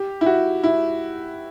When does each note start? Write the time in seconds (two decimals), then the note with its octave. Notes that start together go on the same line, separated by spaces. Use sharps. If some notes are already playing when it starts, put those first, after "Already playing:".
Already playing: G4
0.21 E4
0.26 F#4
0.63 E4